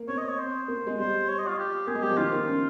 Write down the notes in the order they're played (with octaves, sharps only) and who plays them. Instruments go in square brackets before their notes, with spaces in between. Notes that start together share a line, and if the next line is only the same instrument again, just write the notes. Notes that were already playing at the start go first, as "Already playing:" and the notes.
Already playing: [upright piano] A#3
[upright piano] C4 [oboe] C#5
[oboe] D#5
C#5
C5
[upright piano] A#3
G#3
[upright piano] G3 [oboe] C5
[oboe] C#5
D#5
F4
G4
[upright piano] A#3 [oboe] G#4
[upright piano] G#3
[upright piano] G3 [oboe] G4
[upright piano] F3
[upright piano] D#3 [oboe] F4
[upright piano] A#3
C#4